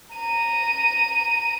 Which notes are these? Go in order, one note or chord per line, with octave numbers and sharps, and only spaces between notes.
A#5 D#7